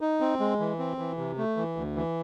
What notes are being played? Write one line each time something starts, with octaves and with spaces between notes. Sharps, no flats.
D#4
C4
G#3
E3
C4
E3
C3
A3
E3
D2
E3